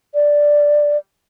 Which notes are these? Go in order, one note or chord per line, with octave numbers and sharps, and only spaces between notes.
D5